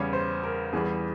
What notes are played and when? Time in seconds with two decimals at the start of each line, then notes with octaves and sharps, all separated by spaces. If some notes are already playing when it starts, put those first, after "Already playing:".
Already playing: E2 C#3 G3 C#5
0.13 C5
0.44 A#4
0.73 E2 E3 G3 G#4